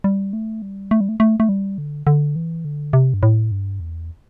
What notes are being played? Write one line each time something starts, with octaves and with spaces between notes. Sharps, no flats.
G3
A3
G3
A3
G3
A3
A3
A3
G3
D3
D3
E3
D3
C3
G2
A2
G2
E2